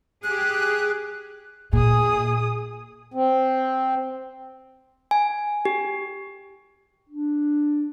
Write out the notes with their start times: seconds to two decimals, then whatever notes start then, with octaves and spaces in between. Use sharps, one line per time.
0.24 G4 G#4 F#6
1.73 A#2 G#4 D#6
3.14 C4
5.11 G#5
5.65 G4
7.09 D4